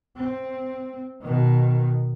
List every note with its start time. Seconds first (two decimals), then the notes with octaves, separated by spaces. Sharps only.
0.16 C4
1.22 B2 D#3